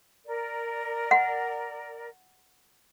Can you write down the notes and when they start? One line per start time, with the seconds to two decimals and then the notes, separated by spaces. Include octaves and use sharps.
0.25 A#4 D5
1.11 F#5